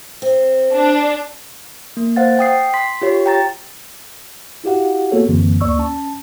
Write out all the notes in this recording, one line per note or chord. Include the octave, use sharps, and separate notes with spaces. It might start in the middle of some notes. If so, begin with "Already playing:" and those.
C4
D4
A#3
C5 F5 F#5 A6
G5 D#6 C7
C6 B6
F4 G4 C#5
G5 A#5 A6
E4 F#4 G4 F5 F#5
A#3 B3 F#4 G#4 A4 C#5
F#2 D3 E3 A#3 C4
D2 A#3 D5 C#6 E6
C#4 A5